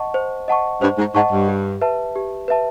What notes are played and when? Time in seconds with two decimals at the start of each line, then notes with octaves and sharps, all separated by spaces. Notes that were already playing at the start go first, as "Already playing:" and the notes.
Already playing: D#5 F#5 A5 C#6
0.14 C5
0.48 D#5 F#5 A5 C#6
0.81 G2 C5
0.98 G#2
1.14 G#2 D#5 F#5 A5 C#6
1.31 G2
1.49 G4
1.81 B4 E5 A5
2.16 G4
2.48 B4 E5 A5